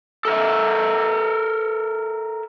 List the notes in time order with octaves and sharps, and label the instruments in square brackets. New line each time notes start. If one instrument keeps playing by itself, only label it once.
[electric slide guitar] A4 A#4 E5